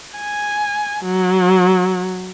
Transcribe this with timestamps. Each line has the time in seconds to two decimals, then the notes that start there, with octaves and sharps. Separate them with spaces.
0.18 G#5
1.03 F#3